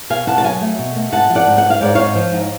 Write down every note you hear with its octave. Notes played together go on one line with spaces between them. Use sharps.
B2 F5 G#5
B2 F#5 A5
A5
F#3 F5 G#5
A3
B2
A3
G#2 F#5 A5
F3
D5 F#5
G#2
F#5
G#2
F5
G#2 D5
G#2 C#5 F5
F3
G#2